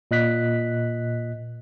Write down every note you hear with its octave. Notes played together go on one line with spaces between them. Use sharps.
A#2 D#5 F#6 B6